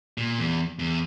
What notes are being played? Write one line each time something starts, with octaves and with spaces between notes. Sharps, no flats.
A#2
E2
E2